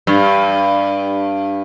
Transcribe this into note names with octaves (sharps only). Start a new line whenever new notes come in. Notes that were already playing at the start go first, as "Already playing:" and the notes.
G2